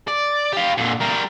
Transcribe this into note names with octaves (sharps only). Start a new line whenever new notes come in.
D5
G4 F5
A#2 D3
G3 A#4